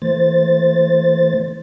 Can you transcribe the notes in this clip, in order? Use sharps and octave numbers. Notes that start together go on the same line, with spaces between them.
E3 A3 C5 A6